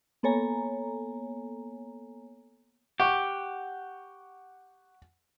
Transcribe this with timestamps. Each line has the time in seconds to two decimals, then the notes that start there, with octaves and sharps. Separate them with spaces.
0.23 A#3 B3 A4 C#5 G#5 A#5
3.00 G4 F#5 C#6